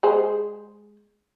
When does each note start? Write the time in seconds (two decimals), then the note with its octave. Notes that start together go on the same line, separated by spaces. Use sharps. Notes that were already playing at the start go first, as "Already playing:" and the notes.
0.03 G#3 G#4 C5